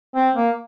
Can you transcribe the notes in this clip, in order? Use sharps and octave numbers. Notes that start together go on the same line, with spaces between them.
C4
A#3